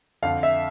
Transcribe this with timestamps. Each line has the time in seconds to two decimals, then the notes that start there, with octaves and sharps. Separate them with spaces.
0.22 F2 D3 F5
0.43 E5